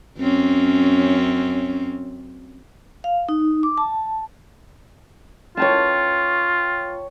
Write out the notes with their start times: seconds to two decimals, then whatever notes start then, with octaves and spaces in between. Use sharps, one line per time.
0.18 F#2 C4 C#4
3.04 F5
3.29 D#4
3.63 D6
3.78 A5
5.57 F4 C#5 G5 A5